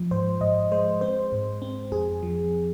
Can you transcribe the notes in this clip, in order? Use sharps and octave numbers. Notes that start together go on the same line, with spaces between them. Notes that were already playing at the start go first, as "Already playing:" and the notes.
Already playing: F3
G#2 C5
G#2 D#5
G#3 C5
C4 C5
G#2
C4
F2 G#4
F3